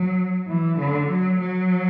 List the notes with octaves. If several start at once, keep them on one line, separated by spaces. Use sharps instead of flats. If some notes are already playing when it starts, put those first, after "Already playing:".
Already playing: F#3
E3
D3
F#3
F#3